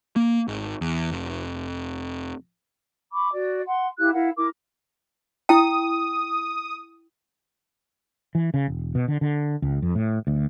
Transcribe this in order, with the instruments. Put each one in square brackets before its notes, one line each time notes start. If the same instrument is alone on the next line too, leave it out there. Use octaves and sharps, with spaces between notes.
[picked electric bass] A#3
G#1
E2
F1
[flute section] B5 C#6 D6
F#4 D5
F#5 C6
E4 G4 F5 F#6
E4 A#4 F5 F#5
E4 A#4 D6
[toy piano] E4 G5 [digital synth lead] D#6
[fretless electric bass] E3
C#3
E1
B2
D3
D3
C#2
F2
A2
D2